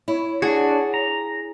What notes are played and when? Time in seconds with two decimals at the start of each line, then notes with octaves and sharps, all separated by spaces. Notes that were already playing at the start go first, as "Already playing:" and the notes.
0.08 E4 C#5
0.42 D4 F#4 G#4
0.94 A#5